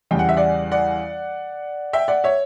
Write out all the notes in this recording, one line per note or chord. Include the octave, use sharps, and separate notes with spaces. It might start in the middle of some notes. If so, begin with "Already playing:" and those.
E2 C#3 G3 G5
F#5
E5
D5 F#5
D5 F#5
E5 G5
D5 F#5
C#5 E5